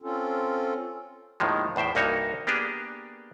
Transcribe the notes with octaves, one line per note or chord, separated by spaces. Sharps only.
C4 C#4 F4 A4
D#2 A2 D#3 F3 G#3
E2 A2 C5 E5 G5
C2 G2 A#3 D#4 F#4 C#5
A#3 B3 D4 G4 G#4